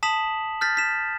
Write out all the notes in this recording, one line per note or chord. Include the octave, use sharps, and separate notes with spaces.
A5 D#6 B6 E7 F#7
F6 G6 A6 B6
B6 E7